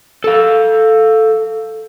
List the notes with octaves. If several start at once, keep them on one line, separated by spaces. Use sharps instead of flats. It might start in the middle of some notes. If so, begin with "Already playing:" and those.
A4 F5